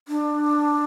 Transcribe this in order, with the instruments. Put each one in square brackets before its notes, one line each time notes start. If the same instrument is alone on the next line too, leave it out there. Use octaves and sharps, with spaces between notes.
[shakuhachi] D4